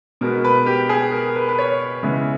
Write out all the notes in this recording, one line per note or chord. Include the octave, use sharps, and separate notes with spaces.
B2 G#3 B3 A#4
B4
G4
G#4
A#4
B4
B4
C#5
C#3 E3 G#3 B3